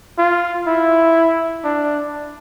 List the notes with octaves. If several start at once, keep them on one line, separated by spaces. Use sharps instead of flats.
F4
E4
D4